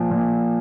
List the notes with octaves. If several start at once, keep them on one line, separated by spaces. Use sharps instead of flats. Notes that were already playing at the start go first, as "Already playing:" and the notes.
Already playing: A#2 F3
A#2